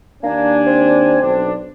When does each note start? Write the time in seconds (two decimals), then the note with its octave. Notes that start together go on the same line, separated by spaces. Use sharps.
0.23 D#2 A#3 D4 G#5
0.66 C4
1.21 B1 D4